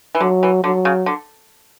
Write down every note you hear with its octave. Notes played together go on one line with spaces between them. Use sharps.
E3
D3 F#3
E3
D3 F#3
C#3
D3